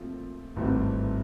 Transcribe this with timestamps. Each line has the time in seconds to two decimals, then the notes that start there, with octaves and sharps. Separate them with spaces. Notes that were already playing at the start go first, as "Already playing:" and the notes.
Already playing: A#2 F3 A3 C4 F4
0.56 G#1 G2 E3 A3 C4